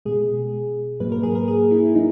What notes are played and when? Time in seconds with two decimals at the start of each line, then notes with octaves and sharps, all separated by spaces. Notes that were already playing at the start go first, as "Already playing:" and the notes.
0.05 B2 G#3 G#4
1.00 G#2 F#3 A#3 B4
1.12 A#4
1.23 G#4
1.35 A#4
1.48 G#4
1.71 E4
1.95 F#3 D#4